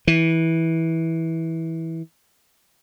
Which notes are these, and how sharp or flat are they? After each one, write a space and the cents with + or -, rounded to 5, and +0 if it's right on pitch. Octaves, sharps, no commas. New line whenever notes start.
E3 -15